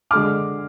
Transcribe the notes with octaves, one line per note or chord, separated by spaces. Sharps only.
D3 G#3 D6 F6